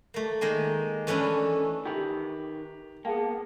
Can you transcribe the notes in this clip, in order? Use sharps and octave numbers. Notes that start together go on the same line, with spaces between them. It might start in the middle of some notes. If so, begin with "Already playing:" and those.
A3 A#3
D#3 G#3 A#3 G#5
E3 A3 C#4 D4 E4
D#3 G4 B4
A#3 B3 G#4 F5 G5 A5